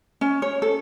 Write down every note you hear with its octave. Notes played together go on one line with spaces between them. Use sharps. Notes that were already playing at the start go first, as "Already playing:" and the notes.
C#4
C#5
A4